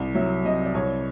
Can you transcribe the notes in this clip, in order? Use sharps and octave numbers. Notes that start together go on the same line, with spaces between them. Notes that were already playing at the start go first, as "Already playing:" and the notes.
Already playing: C2
F#3 E5
C3 D#5
D5
C2 C#5